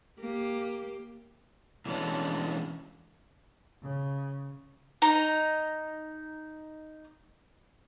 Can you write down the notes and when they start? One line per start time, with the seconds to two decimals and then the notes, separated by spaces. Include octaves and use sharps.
0.20 A#3 G4
1.86 B2 E3 G#3 C#4 D4
3.82 C#3
5.02 D#4 A#5